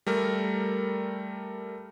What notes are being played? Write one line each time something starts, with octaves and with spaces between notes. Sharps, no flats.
G3 A3 A#4